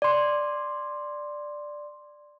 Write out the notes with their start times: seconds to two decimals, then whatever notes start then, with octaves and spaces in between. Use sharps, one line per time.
0.02 D5 C6